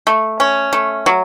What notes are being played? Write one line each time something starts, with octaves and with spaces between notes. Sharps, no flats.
A3
C#4
A3
F#3